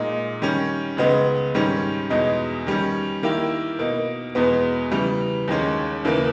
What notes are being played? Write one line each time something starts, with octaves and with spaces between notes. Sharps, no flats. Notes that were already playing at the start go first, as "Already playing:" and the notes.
Already playing: A#2 G#3 D#4
D#3 G3 C#4
C#2 C#3 G#3 B3 D#4
G#2 D#3 G3 C#4
E2 B2 G#3 D#4
D#3 G3 C#4
D#3 A#3 E4 G4
B2 A#3 D#4
E2 B2 G#3 B3
C#3 E3 G3
D#2 D#3 G#3 C#4
D#2 C#3 E3 A#3